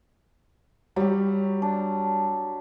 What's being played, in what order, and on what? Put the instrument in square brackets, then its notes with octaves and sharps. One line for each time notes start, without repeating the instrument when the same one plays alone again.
[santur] F#3 G4 [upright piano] G3
[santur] D4